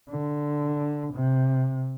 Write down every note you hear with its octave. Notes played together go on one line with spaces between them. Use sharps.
D3
C3